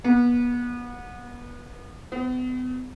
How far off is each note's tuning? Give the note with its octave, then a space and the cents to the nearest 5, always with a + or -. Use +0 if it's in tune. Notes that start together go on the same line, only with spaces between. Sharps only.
B3 -30
B3 +40